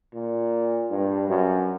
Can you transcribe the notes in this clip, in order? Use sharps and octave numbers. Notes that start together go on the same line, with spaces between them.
A#2
G2
F#2